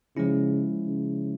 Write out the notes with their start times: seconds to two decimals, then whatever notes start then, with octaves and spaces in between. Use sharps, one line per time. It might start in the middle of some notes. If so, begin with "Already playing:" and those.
0.17 C#3 F3 G#3 C#4 E4
0.86 C#3